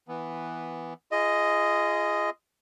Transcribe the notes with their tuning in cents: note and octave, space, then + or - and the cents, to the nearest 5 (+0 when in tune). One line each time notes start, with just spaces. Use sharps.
E3 +0 B3 +0
F4 -35 G#4 +0 D#5 +0